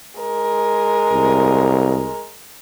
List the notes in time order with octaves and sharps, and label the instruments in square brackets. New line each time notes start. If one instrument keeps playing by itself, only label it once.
[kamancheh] G#3 A#4
[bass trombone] C2